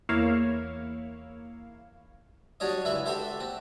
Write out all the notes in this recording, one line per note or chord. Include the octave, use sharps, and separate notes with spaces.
E2 A#3 E4 C#5 F5 E7
F#3 G3 D4 C#5 D#5
C#2 E3 E4 E5
F#4 G4 A4 C5 E5
C4